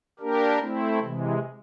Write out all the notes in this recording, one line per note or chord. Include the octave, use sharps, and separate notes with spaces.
A#3 D4 G4 A#4
A3 C4 E4
C3 E3 G#3